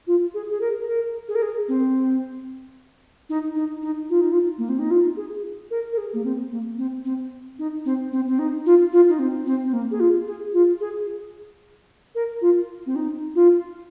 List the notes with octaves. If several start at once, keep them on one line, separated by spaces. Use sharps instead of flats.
F4
G#4
G#4
A#4
A#4
G#4
A#4
G#4
C4
D#4
D#4
D#4
F4
D#4
F4
A#3
C4
D#4
F4
G#4
A#4
A#4
G#4
A#3
C4
A#3
C4
C4
D#4
C4
C4
C4
D#4
F4
F4
D#4
C4
C4
C4
A#3
G#4
F4
G#4
F4
G#4
A#4
F4
C4
D#4
F4